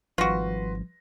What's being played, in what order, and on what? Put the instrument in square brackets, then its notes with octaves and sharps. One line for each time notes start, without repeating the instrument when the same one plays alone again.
[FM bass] G#1 [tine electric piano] F3 G3 [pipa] F4 F#4 [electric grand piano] B4 C6 A#6